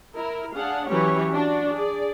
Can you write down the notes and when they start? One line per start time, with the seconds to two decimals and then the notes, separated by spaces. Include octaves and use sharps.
0.15 E4 A#4
0.54 D4 G#4 F5 F#5
0.87 E3 F#3 C#4 G4 C#5
1.33 D4 F#4
1.74 G#4 D5